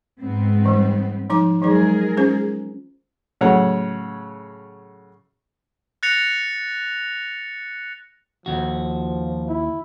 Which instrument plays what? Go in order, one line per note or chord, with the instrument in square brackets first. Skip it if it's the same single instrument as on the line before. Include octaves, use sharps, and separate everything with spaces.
[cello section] G#2 B3 C4
[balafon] E3 G3
F3 D#4 D6
[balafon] E3 F#3 D#4 [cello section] G#3 G#4 A#4
[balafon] C#4 F4 C5
[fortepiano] A2 C#3 F#3 C#5 F#5
[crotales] F#6 A6 A#6 C#7 F7
[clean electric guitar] D#2 F#4 [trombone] F3
[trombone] E4